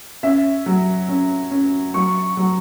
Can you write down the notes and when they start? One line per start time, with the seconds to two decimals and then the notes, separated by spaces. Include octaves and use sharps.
0.23 C#4 E5
0.66 F#3
1.08 C#4
1.51 C#4
1.94 F#3 C#6
2.37 F#3